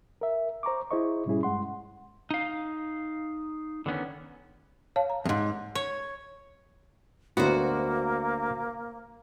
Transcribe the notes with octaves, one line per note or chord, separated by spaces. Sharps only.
A#4 E5
C5 A#5 C#6 D6
E4 G#4 C5 D#5 C#6
G#2 B2 G3 C#4 E4 G#4
G2 G#3 F#5 C6
D#4 F5
D3 D#3 B3 C#4
C#5 F5 A5
A#5
F2 G#2
C#5
D2 A#3 B3 F#4 C5